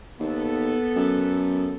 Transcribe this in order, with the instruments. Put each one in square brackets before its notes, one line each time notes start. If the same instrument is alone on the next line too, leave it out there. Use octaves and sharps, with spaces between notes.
[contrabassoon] D#2 [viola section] B3 A4
[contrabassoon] F#2